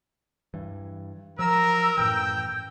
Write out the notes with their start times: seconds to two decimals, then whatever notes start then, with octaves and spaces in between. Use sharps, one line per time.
0.54 G2 E3
1.39 F3 F#3 A#4 A#5 E6
1.97 F#2 A2 E3 G5 G6